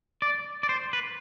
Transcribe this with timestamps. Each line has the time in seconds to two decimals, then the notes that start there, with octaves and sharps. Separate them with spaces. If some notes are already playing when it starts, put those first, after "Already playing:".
0.22 D5
0.63 D5
0.69 C5
0.93 B4